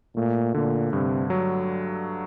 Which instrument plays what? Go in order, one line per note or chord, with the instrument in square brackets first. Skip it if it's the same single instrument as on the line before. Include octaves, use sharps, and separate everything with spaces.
[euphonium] A#2 [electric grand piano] A3
[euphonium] A#2 [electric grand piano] D3
[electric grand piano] G2 [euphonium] C3
[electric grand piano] F#3